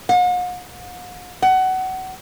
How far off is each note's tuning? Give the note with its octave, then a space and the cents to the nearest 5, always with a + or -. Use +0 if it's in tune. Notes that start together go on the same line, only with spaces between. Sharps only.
F#5 -45
F#5 +25